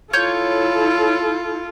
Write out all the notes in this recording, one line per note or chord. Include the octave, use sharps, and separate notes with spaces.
E4 F4 A4 C#5 G6